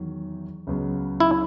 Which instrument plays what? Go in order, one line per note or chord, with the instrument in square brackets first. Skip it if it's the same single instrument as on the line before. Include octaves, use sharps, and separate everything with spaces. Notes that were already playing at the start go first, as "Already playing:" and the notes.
Already playing: [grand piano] E2 D#3 F#3
C#2 C#3 F#3 B3
[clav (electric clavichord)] E4